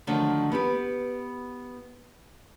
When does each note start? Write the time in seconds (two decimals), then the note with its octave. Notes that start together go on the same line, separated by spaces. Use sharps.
0.07 D3 D#3 F3 F#3 A3
0.52 B3 E4 G4 B4